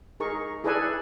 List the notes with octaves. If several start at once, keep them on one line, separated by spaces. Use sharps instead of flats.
D#4 G#4 A#4 C#6
E4 G#4 A4 B4 D5 G#5